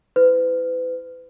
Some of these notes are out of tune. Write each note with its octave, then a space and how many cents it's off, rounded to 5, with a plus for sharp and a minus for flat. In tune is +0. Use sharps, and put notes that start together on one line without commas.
E4 +0 B4 +40